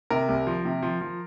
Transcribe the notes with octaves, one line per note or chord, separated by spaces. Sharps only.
C3 A#4
C2
F3
C3
F3
F3